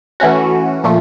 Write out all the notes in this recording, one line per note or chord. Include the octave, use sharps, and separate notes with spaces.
E3 A3 C#4 F#4
A#2 F3 A3